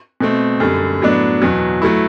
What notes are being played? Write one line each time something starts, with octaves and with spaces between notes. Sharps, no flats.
B2 A3 C4
F#2 D3 G3
A2 F#3 B3 D4
E2 B2 F#3
F#3 A3 E4